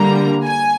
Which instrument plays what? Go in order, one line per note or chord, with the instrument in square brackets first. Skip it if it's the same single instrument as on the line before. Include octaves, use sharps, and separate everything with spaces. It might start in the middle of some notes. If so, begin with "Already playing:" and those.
Already playing: [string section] D3 G3 A#3 A#5
G#5